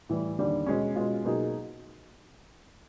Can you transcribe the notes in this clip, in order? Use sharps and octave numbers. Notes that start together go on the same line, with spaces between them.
A2 E3 G3
D#2 D3 G3
B2 G#3 C#4
B2 G#3 C#4 F4
B2 F#3 A#3 D#4 G#4